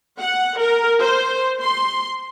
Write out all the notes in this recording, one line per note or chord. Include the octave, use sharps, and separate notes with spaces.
F#5
A#4
C5
C6